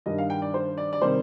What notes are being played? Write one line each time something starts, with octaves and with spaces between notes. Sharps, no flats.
G2 D#3 G3 D#5
F5
G5
D5
C5
D5
D5
C3 D#3 G3 C5